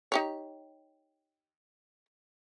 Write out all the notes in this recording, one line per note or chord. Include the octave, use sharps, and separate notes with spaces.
D#4 G4 C#5